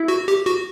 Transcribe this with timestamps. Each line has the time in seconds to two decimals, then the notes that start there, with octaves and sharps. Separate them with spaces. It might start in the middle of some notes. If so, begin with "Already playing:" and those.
Already playing: E4
0.08 F#4
0.28 G4
0.46 F#4